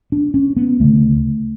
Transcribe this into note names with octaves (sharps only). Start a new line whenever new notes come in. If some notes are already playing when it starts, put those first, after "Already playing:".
D4
C#4
B3
D2 C#3 A3